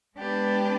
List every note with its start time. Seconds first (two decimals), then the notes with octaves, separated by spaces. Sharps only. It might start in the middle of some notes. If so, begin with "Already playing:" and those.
0.17 G#3 B3 D4 G4 B4